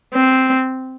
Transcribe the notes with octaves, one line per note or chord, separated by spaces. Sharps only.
C4